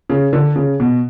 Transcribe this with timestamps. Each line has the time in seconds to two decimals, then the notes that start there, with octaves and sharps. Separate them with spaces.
0.10 C#3
0.33 D3
0.56 C#3
0.80 B2